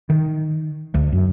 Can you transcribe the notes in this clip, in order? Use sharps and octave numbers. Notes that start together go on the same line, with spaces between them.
D#3
D2
F#2